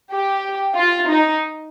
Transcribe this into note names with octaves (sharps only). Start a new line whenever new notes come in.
G4
F4
D#4